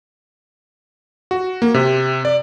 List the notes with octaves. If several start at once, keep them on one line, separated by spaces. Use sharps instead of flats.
F#4
A#3
C3
D5